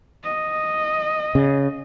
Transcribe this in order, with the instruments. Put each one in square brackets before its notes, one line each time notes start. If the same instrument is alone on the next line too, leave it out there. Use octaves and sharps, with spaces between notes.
[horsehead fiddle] D#5
[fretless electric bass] C#3